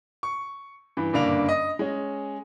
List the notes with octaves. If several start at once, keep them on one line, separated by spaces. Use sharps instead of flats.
C#6
G2 E3
F#1 G2 D3 A#3 D4 F7
D#5
G#3 C#4